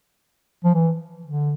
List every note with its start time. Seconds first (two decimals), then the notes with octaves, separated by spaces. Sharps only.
0.64 F3
0.74 E3
1.26 D3